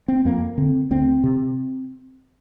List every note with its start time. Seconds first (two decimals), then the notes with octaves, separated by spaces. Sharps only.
0.08 C4
0.25 F2 A#3
0.58 D3 C4
0.91 D2 C4
1.24 C3